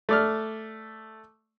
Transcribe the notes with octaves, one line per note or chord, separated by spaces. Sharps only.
A3 D5 F6